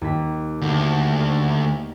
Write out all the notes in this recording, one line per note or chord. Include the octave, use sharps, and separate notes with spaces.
D#2 B6
D2